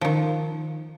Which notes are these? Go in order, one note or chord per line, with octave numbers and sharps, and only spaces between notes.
D#3 F3